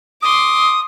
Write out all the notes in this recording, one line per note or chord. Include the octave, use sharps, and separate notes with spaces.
C6 D6 D#6